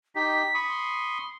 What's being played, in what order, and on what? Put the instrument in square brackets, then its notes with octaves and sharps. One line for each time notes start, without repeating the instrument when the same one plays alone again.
[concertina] D#4 G4 [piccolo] B6
[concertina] B5 C#6 D#6
[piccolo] C6